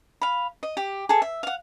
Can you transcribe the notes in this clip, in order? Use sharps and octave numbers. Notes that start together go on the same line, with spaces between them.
F5 B5
D#5
G4
G#4 A4
E5
F5 F#5